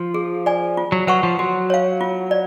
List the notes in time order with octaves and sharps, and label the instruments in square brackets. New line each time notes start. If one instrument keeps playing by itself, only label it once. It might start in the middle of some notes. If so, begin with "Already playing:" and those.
Already playing: [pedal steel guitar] F3
[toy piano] G#4
D5 G#5
F4
[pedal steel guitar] F#3
[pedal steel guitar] F#3 [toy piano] B4 F#5 C#6
[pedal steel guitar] F3
[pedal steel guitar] F#3 [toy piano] F#4
[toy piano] C#5 F5
F4
D5